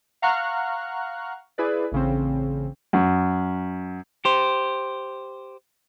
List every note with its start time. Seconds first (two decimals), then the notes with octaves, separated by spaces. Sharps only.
0.22 F5 F#5 A#5 C#6 F6 F#6
1.58 E4 G#4 B4 D5
1.92 A1 C#3 C4
2.93 F#2
4.25 G4 C5